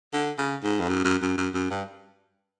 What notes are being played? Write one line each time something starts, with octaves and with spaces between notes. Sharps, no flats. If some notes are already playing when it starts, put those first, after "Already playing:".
D3
C#3
G#2
F2
F#2
F#2
F#2
F#2
F#2
G2